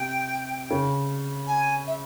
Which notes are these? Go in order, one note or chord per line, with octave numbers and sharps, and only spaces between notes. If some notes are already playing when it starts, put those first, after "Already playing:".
Already playing: C3 G5
C#3
G#5
E5